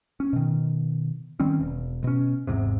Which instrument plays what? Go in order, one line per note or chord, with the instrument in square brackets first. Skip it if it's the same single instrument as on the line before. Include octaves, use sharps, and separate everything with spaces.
[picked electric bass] C#4
B2 D#3
D#3 G3 C4 C#4
E1
B2 C#4
G#1 E2 G#2 C3